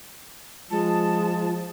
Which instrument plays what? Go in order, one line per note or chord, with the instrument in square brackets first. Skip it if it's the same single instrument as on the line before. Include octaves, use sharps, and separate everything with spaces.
[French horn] F3 [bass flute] G#3 [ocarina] F4 [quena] A5